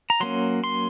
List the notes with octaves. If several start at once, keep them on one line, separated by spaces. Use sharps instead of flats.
A#5
F#3 A#3 C#4 C6
C6